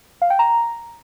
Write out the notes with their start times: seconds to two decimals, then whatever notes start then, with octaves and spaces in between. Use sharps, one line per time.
0.22 F5
0.30 G5
0.39 A#5